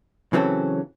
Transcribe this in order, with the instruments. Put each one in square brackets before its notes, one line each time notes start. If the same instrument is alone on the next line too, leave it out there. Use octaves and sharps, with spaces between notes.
[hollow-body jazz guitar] C#3 E3 F#3 C4 C#4 A4